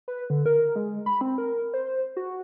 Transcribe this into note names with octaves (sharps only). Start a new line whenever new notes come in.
B4
D3
A#4
G#3
B5
C4
A#4
C5
F#4